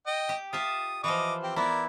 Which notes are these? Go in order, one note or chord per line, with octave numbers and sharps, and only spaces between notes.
D#5 G5
G4
F4 E5 A5 D#6
E3 F3 D#5 D6 D#6
C4 G4
B3 E4 A#4 D5